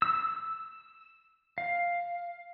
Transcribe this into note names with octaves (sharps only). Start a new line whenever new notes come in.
E6
F5